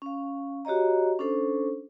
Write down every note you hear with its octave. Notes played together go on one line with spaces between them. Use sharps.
C#4 F5
F#4 G4 C#5 D#5 A#5
C#4 D4 A4 C5